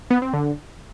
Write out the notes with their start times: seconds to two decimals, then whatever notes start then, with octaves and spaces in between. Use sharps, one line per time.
0.10 B3
0.22 C4
0.33 D3